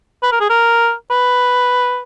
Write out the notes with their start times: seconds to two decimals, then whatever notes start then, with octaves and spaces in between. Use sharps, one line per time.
0.23 B4
0.32 A#4
0.40 G#4
0.50 A#4
1.11 B4